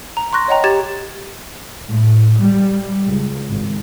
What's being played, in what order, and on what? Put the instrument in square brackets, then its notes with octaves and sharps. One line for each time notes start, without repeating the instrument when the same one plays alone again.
[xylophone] A#5
C6 C#6 F#6 A#6
C#5 D#5 F#5 G5 A#5
G4 G#6 A6 E7
[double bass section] A2
G3
C#2
G#1